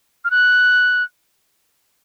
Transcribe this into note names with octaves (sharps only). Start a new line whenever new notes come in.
F6
F#6